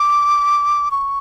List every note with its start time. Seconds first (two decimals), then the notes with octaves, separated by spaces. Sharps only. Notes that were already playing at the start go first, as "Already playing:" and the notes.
Already playing: D6
0.91 C#6